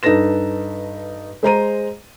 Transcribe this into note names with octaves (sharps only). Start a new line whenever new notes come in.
G2 D#4 A4 B4 A#6 E7
G#3 C5 A#5 D#7